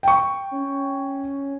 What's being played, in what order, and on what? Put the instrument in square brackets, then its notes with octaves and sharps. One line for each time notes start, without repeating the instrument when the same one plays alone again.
[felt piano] G5 C#6
[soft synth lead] C#4